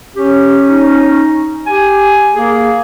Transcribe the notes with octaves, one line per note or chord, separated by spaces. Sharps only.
C#4 G4
D#4
G4 G#5
A#3 G#4